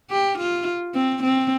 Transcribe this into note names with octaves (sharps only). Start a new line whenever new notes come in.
G4
F4
C4
C4